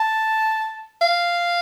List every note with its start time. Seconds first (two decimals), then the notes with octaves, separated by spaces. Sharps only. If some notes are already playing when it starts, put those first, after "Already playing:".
Already playing: A5
1.01 F5